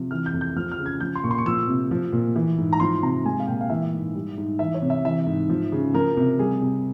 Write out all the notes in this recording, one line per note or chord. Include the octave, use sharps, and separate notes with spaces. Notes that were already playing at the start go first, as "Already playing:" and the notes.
Already playing: C3 F3
E3 F6
G6
F2
G6
F3 F6
F6
C#3
G#6
F3 G6
C6
A#2 C#6
C6
C#6
F3 E6
C3
F3
A#2
E3
G#2
A#5
F3 C6
C3 A#5
G#3 G#5
F5
A#2 G5
F5
E3 E5
G#2
G3
G#2
E3 E5
C#5
C3
E5
E3 E5
G#2
F3
C#3
F3 A#4
C3
G3 G#4
C3